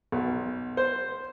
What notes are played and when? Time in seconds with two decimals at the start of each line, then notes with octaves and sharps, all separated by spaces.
0.12 B1
0.77 C5